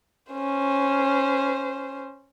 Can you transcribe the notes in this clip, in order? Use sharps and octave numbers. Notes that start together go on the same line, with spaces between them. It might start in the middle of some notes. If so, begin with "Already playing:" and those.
C#4 C5